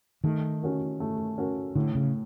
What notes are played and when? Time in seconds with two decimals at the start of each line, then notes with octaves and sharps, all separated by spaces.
0.24 D#3 A3
0.62 C#4 F#4 A#4
1.00 A3
1.38 C#4 F#4 A#4
1.75 A2 D3
1.95 C#3